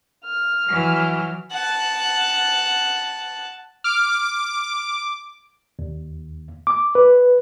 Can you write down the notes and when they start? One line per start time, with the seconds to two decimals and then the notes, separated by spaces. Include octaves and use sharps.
0.25 F6
0.67 E3 F#3
1.52 F#5 A5
3.84 D6 F6
5.79 D#2
6.67 D6
6.95 B4